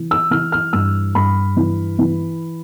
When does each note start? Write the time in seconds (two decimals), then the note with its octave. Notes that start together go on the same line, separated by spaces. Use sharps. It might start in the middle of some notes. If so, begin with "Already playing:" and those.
Already playing: E3
0.11 E6
0.31 E3 F6
0.52 F6
0.73 G2 E6
1.15 G2 B5
1.57 E3
1.99 E3